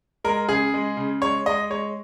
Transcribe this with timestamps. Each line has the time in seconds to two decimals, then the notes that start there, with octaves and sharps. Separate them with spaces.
0.24 G#3 A#4
0.49 C#3 G#4
0.74 G#3
0.97 C#3
1.22 G#3 C#5
1.46 G#3 D#5
1.70 G#3 C#5